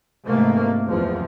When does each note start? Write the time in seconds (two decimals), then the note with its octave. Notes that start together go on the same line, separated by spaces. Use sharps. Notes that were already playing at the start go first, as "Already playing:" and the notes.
0.24 G#2 C3 E3 A3 A#3
0.86 F#1 E2 F3